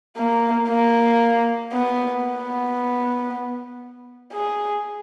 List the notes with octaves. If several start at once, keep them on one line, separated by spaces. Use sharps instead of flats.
A#3
A#3
B3
B3
G#4